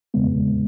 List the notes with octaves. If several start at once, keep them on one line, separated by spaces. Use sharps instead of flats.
E2 C#3 G#3 B3